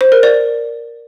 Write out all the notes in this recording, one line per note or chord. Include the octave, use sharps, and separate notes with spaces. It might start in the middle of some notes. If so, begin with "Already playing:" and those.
C5
A#4
D5